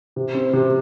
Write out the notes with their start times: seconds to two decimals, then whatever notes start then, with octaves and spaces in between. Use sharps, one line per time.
0.16 C3
0.34 C4
0.53 C3